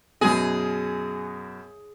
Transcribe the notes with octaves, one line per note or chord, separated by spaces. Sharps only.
F#2 B2 G#4